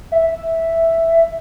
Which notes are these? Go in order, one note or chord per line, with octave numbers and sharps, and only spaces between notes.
E5